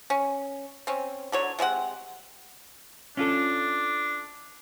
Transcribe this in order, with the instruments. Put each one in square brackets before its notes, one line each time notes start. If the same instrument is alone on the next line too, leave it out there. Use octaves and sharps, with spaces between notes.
[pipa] C#4
C4 C#4
D3 F#3 C#5
C3 G#3 C4 F#5
[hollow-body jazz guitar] C#4 F4 A4 [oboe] D4